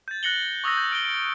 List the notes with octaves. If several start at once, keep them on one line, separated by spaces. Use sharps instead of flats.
G6 A6
F#6 A#6 C#7 F#7 G7
C#6 D#6 E6 G6 A#6
G6
F6 D7 F#7 G7
D7